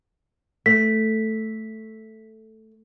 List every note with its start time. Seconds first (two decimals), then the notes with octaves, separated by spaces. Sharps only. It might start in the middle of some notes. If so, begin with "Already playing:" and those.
0.66 A3 B6